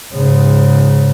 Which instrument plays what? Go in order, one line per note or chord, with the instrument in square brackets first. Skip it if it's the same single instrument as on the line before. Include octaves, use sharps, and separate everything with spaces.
[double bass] G#2 C#3